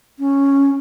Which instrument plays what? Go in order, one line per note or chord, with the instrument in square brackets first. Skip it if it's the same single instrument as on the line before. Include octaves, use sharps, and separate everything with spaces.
[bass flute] C#4